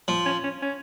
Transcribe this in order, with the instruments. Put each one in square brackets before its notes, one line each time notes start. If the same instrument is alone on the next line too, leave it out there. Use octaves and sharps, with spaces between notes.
[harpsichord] F3
[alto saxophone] C#4
C#4
C#4